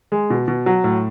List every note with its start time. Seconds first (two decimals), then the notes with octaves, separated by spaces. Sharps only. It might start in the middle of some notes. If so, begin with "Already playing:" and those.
0.12 G#3
0.30 B2
0.48 B2
0.66 F#3
0.84 A2